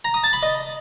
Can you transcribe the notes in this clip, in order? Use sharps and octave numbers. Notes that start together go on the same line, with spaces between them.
A#5
D#6
A5
B5
D#5